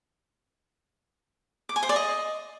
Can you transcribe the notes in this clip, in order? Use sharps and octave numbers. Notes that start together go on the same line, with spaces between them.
D6
G#5
C5
D5
D#5